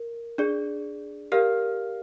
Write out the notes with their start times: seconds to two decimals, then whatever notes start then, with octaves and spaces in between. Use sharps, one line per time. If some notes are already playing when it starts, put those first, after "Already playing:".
Already playing: A#4
0.38 D4 G#4 D5
1.32 G4 A#4 D5 F5 F6